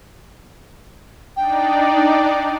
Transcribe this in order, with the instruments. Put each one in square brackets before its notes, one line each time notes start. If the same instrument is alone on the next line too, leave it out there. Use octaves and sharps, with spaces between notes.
[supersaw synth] D4 D#4 D5 [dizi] G5